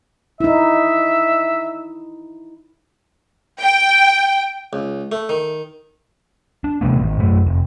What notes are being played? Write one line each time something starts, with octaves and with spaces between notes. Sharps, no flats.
D#4 E4 E5
G5
C#2
A3
D#3
D4
C3 E3 A3 B3
G#1 G#2
F#2 A3
F1